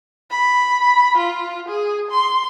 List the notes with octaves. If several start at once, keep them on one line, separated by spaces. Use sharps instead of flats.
B5
F4
G#4
C6